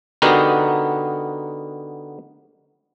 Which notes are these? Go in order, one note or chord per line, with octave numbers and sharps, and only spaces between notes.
D3 B3 D#4 F#4 G4 A#4